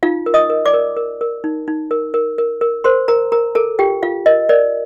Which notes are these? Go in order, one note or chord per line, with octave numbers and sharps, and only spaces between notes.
D#4 F4 F5
A#4
D#5 D#6
A#4
D5 D6
A#4
A#4
A#4
D#4
D#4
A#4
A#4
A#4
A#4
A#4 C5 C6
A#4 A#5
A#4 A#5
A4 A#4 A5
F4 G4 G5
F4 F5
A#4 D#5
A#4 D5